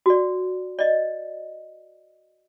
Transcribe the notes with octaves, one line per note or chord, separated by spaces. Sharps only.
F#4 D5
D5 D#5